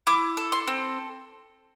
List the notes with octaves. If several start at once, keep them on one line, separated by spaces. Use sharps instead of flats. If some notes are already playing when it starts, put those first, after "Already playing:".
E4 D6
A4
C6
C4